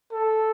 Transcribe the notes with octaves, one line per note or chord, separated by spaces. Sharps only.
A4